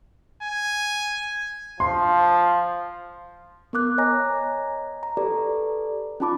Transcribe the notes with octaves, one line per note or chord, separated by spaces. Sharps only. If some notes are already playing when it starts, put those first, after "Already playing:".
G#5
F3 C6
B3 A#4 D6 F#6
C#5 D#5 G#5 A#5 A#6
A#5
G4 A4 B4 D5
C#4 D#4 F4 A5 B5 D6